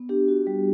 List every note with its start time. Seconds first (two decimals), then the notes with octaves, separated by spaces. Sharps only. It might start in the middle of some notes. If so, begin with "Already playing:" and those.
Already playing: B3
0.09 D4 G4
0.28 F#4
0.47 G3